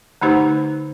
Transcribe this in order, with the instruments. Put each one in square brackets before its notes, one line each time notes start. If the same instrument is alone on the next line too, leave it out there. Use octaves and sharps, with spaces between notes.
[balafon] D3 A3 D#4 G4 C5